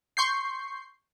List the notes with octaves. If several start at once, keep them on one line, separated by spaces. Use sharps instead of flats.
C6 C#6 G6 C7